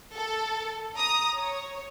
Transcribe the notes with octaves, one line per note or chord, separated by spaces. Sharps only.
A4
A#5 D#6
C#5